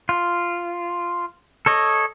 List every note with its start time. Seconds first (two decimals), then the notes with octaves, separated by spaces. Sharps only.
0.09 F4
1.66 A4 C#5 D#5